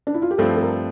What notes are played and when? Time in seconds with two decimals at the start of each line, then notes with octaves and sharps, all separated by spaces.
0.07 D4
0.14 E4
0.22 F4
0.31 G4
0.38 G2 F3 A3 C4 A4
0.56 A4
0.61 A#4